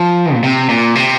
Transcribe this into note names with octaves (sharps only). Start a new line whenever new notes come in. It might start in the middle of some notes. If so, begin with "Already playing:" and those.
Already playing: F3
A#2
C3
A#2
C3